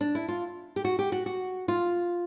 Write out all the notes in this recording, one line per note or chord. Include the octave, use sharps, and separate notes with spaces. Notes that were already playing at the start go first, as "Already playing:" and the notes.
D4
E4
F4
G4
F#4
G4
F#4
F#4
F4